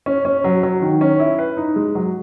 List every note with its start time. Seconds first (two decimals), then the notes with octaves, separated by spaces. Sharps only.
0.06 C#4
0.25 C#4
0.44 F#3
0.63 F#3
0.82 D#3
1.01 C#4
1.19 E4
1.39 B4
1.57 D#4
1.76 G#3
1.95 F#3